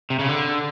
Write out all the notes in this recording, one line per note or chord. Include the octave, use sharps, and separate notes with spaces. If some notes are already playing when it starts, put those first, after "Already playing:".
C3
C#3
D3